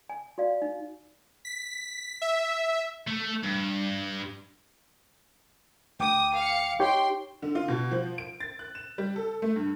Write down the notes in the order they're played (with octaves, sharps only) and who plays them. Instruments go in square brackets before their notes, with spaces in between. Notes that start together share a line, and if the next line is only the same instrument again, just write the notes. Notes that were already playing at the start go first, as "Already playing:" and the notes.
[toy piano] G#5
F#4 D5 F5
D#4
[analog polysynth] B6
E5
[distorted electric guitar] A3
G2
[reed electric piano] D2 G5 D6 [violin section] D#6
[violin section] F5 C#7
[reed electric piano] D#4 G4 C#5 [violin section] G5 C6
[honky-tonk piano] D3
F4
B2
F3
D7
A6
F#6
E7
G3
A4
A3
G2